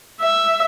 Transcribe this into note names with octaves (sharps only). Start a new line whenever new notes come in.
E5